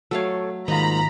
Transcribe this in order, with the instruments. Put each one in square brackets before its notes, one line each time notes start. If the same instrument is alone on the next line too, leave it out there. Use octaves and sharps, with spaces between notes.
[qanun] F#3 A3 F5 [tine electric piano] A4 C#5
[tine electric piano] G#2 A#3 F4 [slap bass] D#3 [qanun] D#4 [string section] A#5 B5